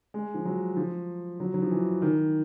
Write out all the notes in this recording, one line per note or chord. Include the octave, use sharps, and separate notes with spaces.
G#3
F3
F#3
F3
F#3
F#3
F3
E3
D#3